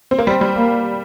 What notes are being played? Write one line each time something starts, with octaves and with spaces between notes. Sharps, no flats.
C4
A#3
G3 C4
G3
A#3